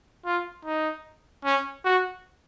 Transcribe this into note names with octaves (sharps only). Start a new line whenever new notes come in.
F4
D#4
C#4
F#4